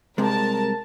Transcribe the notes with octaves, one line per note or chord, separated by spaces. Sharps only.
C2 C3 G#3 A#4 A5